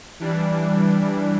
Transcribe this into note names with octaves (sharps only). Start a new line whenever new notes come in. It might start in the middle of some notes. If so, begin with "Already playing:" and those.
E3 G3 D4